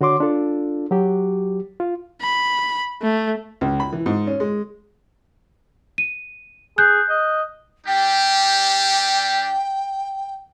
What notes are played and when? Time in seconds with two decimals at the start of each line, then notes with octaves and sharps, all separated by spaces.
0.01 D3 F#4 C#5 C6 D6
0.20 D4 F4 A4
0.91 F#3 F#4 G4
1.80 F4
2.21 B5
3.02 A3
3.61 C#2
3.80 B5
3.93 E3
4.06 G#2
4.27 C#4
4.40 G#3
5.98 D#7
6.78 G#4 F#6 G6
7.09 D#5
7.87 G3 D4 G4 G5